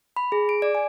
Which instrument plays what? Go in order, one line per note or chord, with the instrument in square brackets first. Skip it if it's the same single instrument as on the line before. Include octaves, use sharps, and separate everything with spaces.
[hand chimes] B5
G#4
D7
D5
G#5